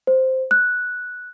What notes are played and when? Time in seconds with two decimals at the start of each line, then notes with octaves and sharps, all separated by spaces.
0.07 C5
0.51 F#6